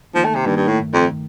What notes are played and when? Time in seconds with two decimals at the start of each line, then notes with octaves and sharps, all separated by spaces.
0.14 D#3 F3 A#3 D#4
0.25 A3
0.35 C3
0.45 G2 D#3 A#3 D#4
0.57 G2
0.68 A2
0.78 G2 D#3 A3
0.94 F2
1.11 D#3